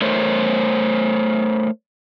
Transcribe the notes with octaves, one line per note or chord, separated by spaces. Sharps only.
A3 A#4 C5 C#5 E5